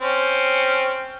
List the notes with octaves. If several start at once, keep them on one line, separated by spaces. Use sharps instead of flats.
C4 C#4